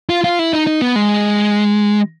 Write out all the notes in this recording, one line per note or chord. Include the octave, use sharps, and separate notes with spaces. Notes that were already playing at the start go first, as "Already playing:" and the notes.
F4
F4
E4
D#4
D#4
B3
G#3